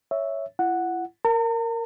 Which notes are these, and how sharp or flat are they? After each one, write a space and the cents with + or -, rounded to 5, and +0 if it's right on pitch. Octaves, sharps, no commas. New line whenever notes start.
C#5 +5 E5 +0
E4 +40 F#5 +0
A#4 -10 A#5 -45